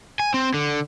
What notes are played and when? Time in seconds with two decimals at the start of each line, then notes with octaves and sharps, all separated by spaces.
0.20 G#5
0.34 C4
0.54 D3